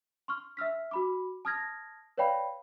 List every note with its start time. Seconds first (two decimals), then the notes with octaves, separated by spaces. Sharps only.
0.28 C6 C#6 F6
0.57 E5 E6 F6 B6
0.91 F#4 B5 D6
1.45 A5 D#6 F6 G#6 A#6
2.18 B4 C#5 D5 F5 G5 B5